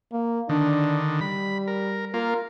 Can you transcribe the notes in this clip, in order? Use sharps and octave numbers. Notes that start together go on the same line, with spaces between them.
A#3
D3 D#3 D4
G3 B5
A#4
A#3 F4 A#4